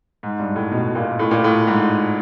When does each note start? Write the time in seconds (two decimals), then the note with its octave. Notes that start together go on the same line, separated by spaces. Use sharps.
0.23 G#2
0.39 G2
0.56 A2
0.72 B2
0.95 A#2
1.19 A2
1.31 A#2
1.44 A2
1.67 G#2